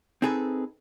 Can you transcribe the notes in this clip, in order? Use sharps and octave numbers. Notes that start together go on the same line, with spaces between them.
C4 D#4 G#4 A4 B4